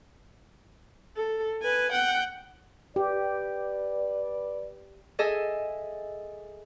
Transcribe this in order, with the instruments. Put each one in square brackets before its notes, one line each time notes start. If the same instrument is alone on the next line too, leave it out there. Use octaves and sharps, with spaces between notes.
[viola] A4
B4 G#5
F#5 G5
[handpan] G4 [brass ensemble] B4 D5
[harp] G#4 A4 D#5 E5